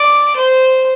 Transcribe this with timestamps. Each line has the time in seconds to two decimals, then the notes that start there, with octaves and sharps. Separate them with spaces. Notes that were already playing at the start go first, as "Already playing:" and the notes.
Already playing: D5
0.36 C5